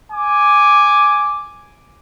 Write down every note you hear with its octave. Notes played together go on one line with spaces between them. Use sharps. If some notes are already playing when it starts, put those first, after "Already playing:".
G#5 D6